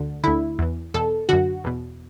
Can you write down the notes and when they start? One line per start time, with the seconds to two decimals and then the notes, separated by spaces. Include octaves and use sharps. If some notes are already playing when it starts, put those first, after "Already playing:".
Already playing: D2 D3
0.23 D2 D3 E4
0.59 E2 E3
0.94 E2 B2 A4
1.29 F#2 D3 F#4
1.64 E2 B2